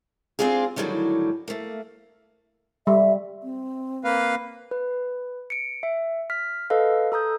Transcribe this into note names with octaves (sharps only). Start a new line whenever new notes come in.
C4 D4 F4 G4 G#4
A2 D3 D#3 F#3 G3 A3
A3 A#3
G3 E5
C4
A#3 B4 F5
B4
C#7 D7
E5
F6 B6
A4 B4 D#5 F5
A4 A#5 D#6 G6